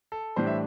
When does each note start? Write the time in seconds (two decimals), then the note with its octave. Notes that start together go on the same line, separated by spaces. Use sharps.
0.12 A4
0.36 A2 E3 G3 D4 C5
0.47 E5